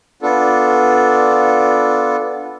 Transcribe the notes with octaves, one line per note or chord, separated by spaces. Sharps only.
B3 D4 F4 A4